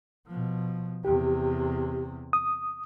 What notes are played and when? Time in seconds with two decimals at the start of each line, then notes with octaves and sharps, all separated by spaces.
0.27 B2 F3
1.05 E2 C3 G4
2.33 D#6